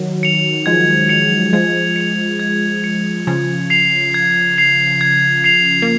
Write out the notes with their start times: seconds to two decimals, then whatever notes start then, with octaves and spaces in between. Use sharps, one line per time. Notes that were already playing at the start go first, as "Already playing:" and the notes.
Already playing: D#3 F#3
0.23 C#7 F7
0.66 F3 G#3 G#6
1.09 C#7 F7
1.53 F3 G#3 G#6
1.96 C#7 F7
2.40 G#6
2.84 C#7 F7
3.27 C#3 F3 G#6
3.70 C7 F7
4.14 G#6
4.58 C7 F7
5.01 G#6
5.44 C7 F7
5.82 A#3